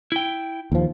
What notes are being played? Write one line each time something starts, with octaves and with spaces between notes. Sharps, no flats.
E4 G5
D#2 F3